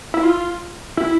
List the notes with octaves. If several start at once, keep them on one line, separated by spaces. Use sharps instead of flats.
E4
F4
E4